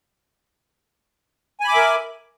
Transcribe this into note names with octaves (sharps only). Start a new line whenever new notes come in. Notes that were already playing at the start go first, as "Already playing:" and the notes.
A#4 E5 G#5 B5 D6